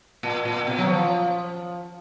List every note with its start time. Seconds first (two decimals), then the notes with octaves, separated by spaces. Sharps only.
0.23 A#2
0.45 A#2
0.67 B2
0.78 F#3
0.88 F3